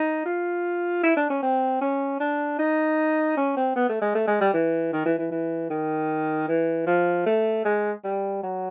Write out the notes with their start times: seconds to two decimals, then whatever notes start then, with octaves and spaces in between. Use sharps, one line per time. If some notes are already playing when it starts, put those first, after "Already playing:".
Already playing: D#4
0.26 F4
1.03 E4
1.17 D4
1.30 C#4
1.43 C4
1.81 C#4
2.20 D4
2.59 D#4
3.37 C#4
3.57 C4
3.76 B3
3.89 A3
4.02 G#3
4.15 A3
4.28 G#3
4.41 G3
4.54 E3
4.93 D#3
5.06 E3
5.19 E3
5.31 E3
5.70 D#3
6.48 E3
6.87 F3
7.26 A3
7.65 G#3
8.04 G3
8.43 F#3